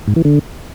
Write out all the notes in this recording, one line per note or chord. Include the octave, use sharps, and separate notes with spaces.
G#2
E3
D3